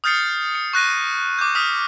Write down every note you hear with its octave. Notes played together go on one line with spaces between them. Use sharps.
D#6 F6 G6 A6 C7 C#7
C#7
C#6 F#6 A#6 D#7
D#7
D6 G6
D#6 F6 B6